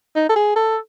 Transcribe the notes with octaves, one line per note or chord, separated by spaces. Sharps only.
D#4
A4
G#4
A4